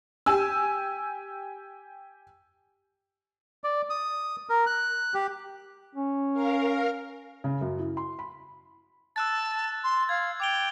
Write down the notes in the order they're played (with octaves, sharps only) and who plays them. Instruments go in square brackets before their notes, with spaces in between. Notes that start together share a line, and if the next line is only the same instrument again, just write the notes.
[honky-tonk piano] G4 G#5 E6
[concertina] D5
D#6
A#4
F#6
G4
[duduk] C#4
[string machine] A#4 F5
[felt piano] C#3
F#2
E4
C6
B5
[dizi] A5 [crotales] E6 F#6 A6
[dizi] C6
[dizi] F5 [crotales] G#6
[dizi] G5 [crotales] D6 F7 G7